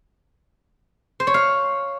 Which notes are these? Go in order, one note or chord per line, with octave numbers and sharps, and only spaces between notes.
C5
C#5
F5